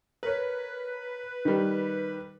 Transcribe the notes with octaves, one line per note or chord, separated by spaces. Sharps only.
A#4 B4 C#5
D#3 G3